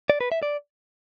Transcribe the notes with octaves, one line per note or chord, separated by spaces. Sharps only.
D5
B4
E5
D5